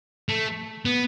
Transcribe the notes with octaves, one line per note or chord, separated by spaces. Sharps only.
A3
B3